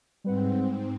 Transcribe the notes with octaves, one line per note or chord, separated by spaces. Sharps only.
G#2 G3 C4 B4 F#5